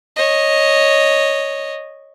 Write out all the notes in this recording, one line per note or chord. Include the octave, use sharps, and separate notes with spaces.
C#5 D#5